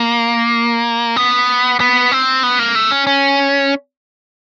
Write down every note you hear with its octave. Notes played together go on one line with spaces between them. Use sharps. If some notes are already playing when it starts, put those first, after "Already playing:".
Already playing: A#3
B3
B3
C4
B3
A#3
A3
C#4
C#4